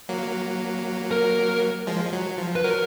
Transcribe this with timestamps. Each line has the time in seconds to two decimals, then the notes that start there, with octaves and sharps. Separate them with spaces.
0.09 F#3 A#3
1.11 A#4
1.87 F3 G#3
2.13 F#3
2.38 F3
2.56 B4
2.64 F#3 A#4